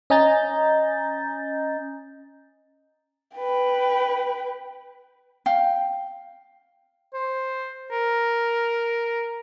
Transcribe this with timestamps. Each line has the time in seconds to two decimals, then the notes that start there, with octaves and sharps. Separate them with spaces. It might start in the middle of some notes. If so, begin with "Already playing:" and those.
0.10 C#4 D#5 G#5 A#5 G6 A6
3.35 B4 G5
5.46 F5 G5
7.14 C5
7.91 A#4